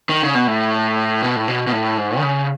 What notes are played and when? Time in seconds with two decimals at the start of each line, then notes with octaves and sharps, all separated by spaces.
0.09 D#3
0.22 C#3
0.35 B2
0.47 A2
1.22 B2
1.36 A2
1.48 B2
1.67 B2
1.72 A2
1.97 G#2
2.18 D#3
2.22 C#3